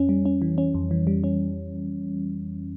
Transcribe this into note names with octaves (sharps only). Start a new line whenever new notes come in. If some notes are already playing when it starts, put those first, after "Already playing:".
Already playing: F2 C#4
G3
C#4
E3
C#4
F2
E3
G3
C#4